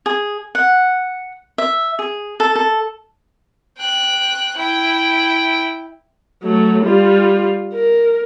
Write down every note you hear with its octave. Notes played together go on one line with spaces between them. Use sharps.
G#4
F#5
E5
G#4
A4
A4
G5 F#6
E4 G5
F#3 A3
G3 F4
A#4